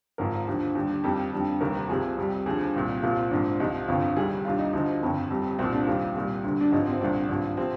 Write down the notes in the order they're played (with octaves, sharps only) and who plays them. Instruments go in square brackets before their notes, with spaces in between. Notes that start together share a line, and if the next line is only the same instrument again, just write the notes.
[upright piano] G#1 G#2 F3 A#4
D#2 D3 F3
D#2 D3 G3
F2 D#3 G3 G4
F2 D3 G3
F1 D#2 D#3 G3 A#4
C2 C3 F3 G#4
F2 C3 G3
D#2 D3 F3 G#4
C2 A#2 G3
C2 A#2 F3 F4
G#1 G#2 F3 D4
C2 C3 F3 D#4
G1 F2 D3 F4
C2 C3 D#3 G3 G#4
D#2 D3 G3 F4
D#4
D2 D3 F3 D#4
G1 F2 D#3
F2 C3 G3
C2 A#2 F3 C4
D4
D#2 D#3 G3 F4
C2 A#2 G3
D2 D3 G3
D4
G#1 G2 F3 D#4
C4
C2 A#2 G3 D4
G#1 G2 F3
C3 F3 C4